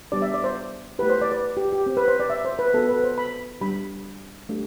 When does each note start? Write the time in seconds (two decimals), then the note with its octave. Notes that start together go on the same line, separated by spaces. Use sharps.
0.12 G3 B3 D4 G4 D5
0.22 E5
0.34 D5
0.44 C5
0.99 A3 E4 G4 B4
1.10 C5
1.21 D5
1.32 B4
1.57 G4
1.73 G4
1.86 C4 G4
1.97 B4
2.08 C5
2.20 D5
2.30 E5
2.45 C5
2.59 B4
2.74 B3 F#4 A4
2.89 B4
3.04 C5
3.18 B5
3.61 G3 D4 G4 B5
4.49 A3 D4 G4